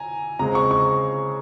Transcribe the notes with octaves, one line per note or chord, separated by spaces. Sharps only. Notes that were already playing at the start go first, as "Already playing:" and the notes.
Already playing: G#5 A#5
C#3 G#3 C4 A#5
C#6
C#6